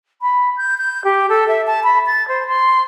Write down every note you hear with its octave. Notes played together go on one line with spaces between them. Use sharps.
B5
G6
G6
G4
A4
E5
A5
B5
A6
C5
C6